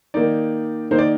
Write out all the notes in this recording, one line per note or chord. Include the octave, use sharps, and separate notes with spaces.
D#3 A#3 D#4 D5
D#3 A#3 D#4 C5
D5